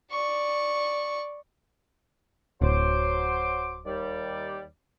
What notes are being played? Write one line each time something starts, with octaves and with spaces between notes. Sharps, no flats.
D5 C#6
D1 F#3 C5 D6
D#2 G3 D5